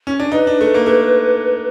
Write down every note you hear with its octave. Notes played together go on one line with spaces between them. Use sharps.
C#4
D4
D#4 B4
D4
A3
A#3
A3